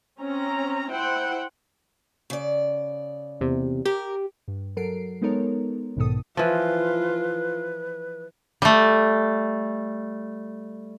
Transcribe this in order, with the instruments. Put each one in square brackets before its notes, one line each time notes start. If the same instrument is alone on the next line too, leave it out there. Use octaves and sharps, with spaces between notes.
[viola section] C4 C#4 A#5
E4 C5 F#5 G5
[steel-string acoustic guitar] C#3 D5
[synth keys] E2 C3
[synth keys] G4 [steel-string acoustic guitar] A#4
[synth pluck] G2
F#3 A4 A#4 C7 D7
G#3 B3 D#4 A4 A#4 C#5
B1 G#2 B2 D#3 A4 D#6
[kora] E3 F3 [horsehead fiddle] F4 [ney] B4
[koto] G3 A3